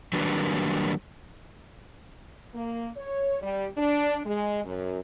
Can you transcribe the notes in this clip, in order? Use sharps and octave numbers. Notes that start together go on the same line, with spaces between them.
D#3 F#3 G3 A#3 D4 B4
A#3
C#5
G3
D4
G#3
F#2